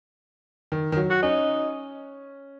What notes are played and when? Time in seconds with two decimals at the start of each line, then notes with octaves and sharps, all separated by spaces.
0.72 D#3
0.92 D#3
0.97 F#3
1.10 F#4
1.22 C#4 D#4